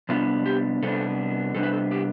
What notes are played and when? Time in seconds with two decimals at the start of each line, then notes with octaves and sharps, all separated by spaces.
0.09 C3 G3 B3 D4 F4
0.46 G4
0.82 C3 G3 B3 D4 A4
1.54 C3 G3 B3 D4 A4
1.63 B4
1.73 A4
1.91 G4